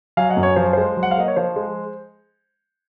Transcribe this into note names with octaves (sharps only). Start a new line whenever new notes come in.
F#3 F5 G#5
D#5 F#5
F#2
C#5
F3 C5
G#3 C5
F#3
F#5
F5
A#3 D#5
C#5
F3 C5
G#3